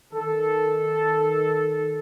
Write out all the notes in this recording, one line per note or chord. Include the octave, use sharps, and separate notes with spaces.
D#3 A4